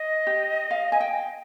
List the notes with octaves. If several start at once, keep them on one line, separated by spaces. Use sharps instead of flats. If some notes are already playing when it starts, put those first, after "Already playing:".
Already playing: D#5
G4
F5
G#5
G5